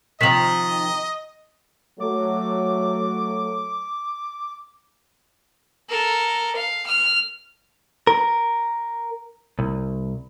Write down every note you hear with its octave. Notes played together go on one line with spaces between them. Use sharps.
C3 D#3 F3 D#5 A#5 B6 E7 F#7
F#3 A3 D6
A4 A#4
F5
F6
A#4
C2